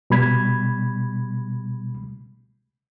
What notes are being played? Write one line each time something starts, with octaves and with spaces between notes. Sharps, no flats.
B2 G3 B5 G#6